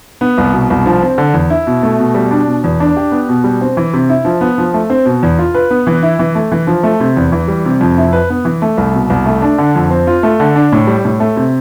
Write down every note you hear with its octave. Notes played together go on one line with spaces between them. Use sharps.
B3
C2
B2
C2
F3
C4
D3
E2
E4
B2
A3
B2
G3
D4
B2
E2
D4
G4
B3
B2
G3
C4
E3
C3
E4
F3
B3
F3
A3
C4
B2
E2
F4
B4
B3
E3
E4
E3
A3
E3
F3
A3
C3
E2
E3
G3
C3
F2
E4
B4
B3
E3
A3
C2
B2
C2
A3
D4
D3
F2
C4
F4
A3
D3
D4
A2
G3
A2
A3
C3